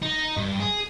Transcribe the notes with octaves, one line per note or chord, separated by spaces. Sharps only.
D#4
G2
G#4